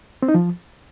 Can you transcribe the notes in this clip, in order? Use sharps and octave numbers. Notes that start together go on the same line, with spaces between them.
C4
D#4
F3